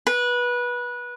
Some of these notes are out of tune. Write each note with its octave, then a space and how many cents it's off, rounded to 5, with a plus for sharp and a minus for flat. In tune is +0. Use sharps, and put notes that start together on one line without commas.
B4 -20